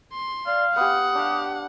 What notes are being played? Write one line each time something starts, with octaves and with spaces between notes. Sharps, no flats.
C6
D5 F5
B3 G4 F#5 D#6
D4 G4 F5